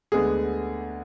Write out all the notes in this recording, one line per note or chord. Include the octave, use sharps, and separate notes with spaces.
D2 D3 G#3 B3 G#4